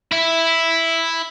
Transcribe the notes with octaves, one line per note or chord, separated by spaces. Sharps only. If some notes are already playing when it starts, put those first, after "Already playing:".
E4 E5